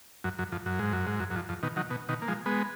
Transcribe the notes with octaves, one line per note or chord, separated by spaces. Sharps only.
F#2
F#2
F2
F#2
G#2
F#2
G#2
F#2
F#2
F2
F2
B2 D#3
D#3 F#3
B2
B2 D#3
A#3
F3 G#3
G#3 B3